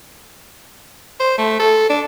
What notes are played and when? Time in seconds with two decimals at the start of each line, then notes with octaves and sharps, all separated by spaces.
1.20 C5
1.38 A3
1.60 A4
1.89 D4